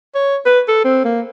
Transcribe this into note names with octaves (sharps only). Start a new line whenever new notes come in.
C#5
B4
A4
C4
A#3